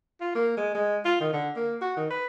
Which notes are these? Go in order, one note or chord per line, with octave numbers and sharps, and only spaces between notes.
F4
A#3
G#3
G#3
F4
D#3
D3
A#3
F#4
D#3
B4